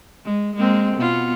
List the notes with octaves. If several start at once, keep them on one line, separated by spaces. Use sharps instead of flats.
G#3
G#3 A#3 C4
B2 B3 F4